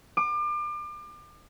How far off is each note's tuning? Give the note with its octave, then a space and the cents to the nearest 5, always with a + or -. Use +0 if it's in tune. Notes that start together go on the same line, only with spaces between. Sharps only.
D6 +35